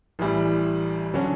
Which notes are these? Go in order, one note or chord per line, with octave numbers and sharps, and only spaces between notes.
A1 A2 E3 G3
D3 F#3 C#4